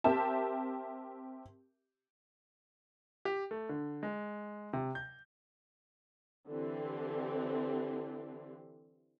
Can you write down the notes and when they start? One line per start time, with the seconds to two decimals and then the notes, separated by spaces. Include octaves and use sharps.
0.04 C4 G4 A#4 E5 A5
3.25 G4
3.51 A3
3.69 D3
4.03 G#3
4.73 C3
4.95 G6
6.48 D3 E3 C4 G4